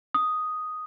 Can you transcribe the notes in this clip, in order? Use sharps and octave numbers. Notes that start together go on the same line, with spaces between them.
D#6